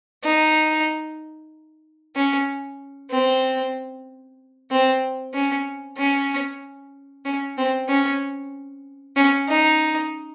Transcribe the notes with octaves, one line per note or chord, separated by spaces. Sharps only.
D#4
C#4
C4
C4
C#4
C#4
C#4
C4
C#4
C#4
D#4